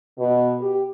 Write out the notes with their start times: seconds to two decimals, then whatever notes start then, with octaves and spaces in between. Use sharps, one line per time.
0.18 B2
0.61 G4